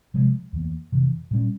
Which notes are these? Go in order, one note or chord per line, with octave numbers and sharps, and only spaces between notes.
C3 F3 G#3
E2 E3 A#3
F2 C3 E3
A#2 G3 C#4